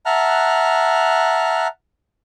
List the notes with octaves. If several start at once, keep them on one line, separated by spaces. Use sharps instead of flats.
E5 F#5 A5 A#5 F6 F#6